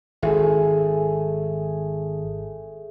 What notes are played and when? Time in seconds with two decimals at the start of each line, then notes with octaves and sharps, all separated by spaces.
0.22 G#1 A3 G#4